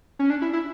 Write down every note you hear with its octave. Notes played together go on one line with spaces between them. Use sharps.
C#4
D4
E4
E4